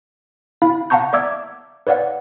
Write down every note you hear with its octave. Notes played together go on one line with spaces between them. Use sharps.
E4 F5 B5
F5 F#5 A5 A#5 C#6 G6
D5 E5 D6 E6 G#6
B4 C#5 D5 F5 F#5